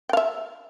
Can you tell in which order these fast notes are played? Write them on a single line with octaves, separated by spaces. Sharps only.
G5 F5 E5